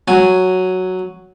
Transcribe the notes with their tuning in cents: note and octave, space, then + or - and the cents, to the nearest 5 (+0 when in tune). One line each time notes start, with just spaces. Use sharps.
F#3 +0 G#5 +0